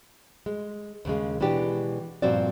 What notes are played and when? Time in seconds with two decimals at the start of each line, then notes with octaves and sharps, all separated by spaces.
0.46 G#3
1.05 D#2 C#3 G#3
1.40 B2 E3 G#3 D4 G4
2.22 G2 A#2 F3 C4 F#4 D5